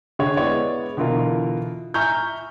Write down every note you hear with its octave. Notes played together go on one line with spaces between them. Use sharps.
D3 G#4 C#5
G#3 B3 E4 C#5 D5
B2 D3 E3 E4 F4 A#4
E5 G#5 A#5 C#6 F6 G6